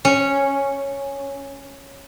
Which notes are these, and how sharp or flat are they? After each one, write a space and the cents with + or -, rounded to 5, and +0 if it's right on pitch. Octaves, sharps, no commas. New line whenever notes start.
C#4 -5